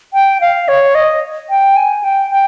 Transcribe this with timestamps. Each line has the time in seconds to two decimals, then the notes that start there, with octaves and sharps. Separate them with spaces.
0.14 G5
0.41 F5
0.68 C#5
0.95 D#5
1.50 G5
1.76 G#5
2.04 G5
2.31 G5